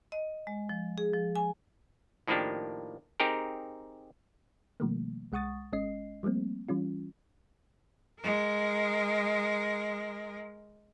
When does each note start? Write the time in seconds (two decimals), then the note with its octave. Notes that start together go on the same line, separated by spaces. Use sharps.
0.12 D#5
0.47 G#3
0.69 F3
0.98 G#4
1.14 F3
1.36 G#5
2.27 A2 D#3 F3 A#3 D4 G4
3.20 C4 D#4 G4 G#4 A#4
4.80 B2 D#3 F3 G3 A3 A#3
5.32 C2 G#3 F#5 C#6 D#6 A6
5.72 G#1 G#3 C#4 D#5 C7
6.23 F3 G3 A3 A#3 C4
6.69 E3 G3 C#4 F4
8.20 G#3 A#4